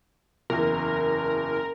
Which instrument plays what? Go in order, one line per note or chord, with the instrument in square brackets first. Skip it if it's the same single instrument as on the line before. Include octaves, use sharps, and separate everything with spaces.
[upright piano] F#1 E2 [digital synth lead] A#4